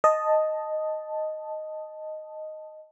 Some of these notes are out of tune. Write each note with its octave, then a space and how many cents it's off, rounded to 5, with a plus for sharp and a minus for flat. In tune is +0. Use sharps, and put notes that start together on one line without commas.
D#5 +0 A5 +0